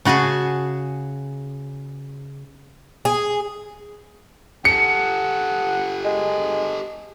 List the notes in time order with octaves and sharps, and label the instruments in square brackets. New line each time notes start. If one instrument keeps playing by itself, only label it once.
[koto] C#3 F#4 G#4 G#5 A5
[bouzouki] G#4
[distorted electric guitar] G4 A4 [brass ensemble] F#5 [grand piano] C#7
[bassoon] G#3